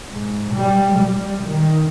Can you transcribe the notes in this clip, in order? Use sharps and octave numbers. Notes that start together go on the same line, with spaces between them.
G#2
G3
G3
D#3